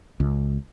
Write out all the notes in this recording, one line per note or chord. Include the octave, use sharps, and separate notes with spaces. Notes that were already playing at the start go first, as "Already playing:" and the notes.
C#2